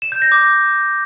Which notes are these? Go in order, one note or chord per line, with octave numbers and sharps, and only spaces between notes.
E7
G6
A#6
D6